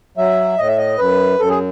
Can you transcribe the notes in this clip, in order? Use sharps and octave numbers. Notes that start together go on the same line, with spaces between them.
F#3 E5
A2 D#5
E5
D#5
F#2 B4
F#2 A4
G#4